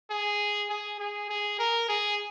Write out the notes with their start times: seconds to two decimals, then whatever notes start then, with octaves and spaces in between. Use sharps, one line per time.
0.11 G#4
0.70 G#4
1.00 G#4
1.29 G#4
1.59 A#4
1.89 G#4